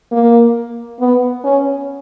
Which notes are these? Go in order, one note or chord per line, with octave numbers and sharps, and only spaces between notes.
A#3
B3
C#4